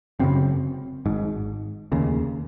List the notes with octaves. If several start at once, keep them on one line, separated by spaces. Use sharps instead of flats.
F#1 F#2 C#3 C4
G#1 G#2
F1 D#2 C#3